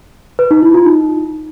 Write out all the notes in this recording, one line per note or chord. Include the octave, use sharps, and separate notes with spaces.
B4
D#4
E4
F4
D#4